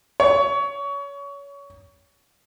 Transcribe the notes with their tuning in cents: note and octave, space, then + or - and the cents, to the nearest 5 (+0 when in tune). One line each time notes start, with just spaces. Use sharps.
C#5 +25